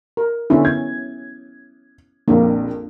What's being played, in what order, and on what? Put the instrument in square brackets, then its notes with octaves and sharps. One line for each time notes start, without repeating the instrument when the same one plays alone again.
[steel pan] A#4
[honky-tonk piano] D3 [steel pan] B3 C#4 E4
[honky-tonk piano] G#6
[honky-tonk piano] A#1 F2 [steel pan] A#3 D4